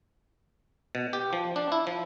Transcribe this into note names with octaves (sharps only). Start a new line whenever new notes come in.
B2
G4
F3
D4
E4
F3